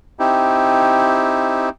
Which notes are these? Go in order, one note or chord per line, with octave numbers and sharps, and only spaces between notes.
C4 D#4 E4 G4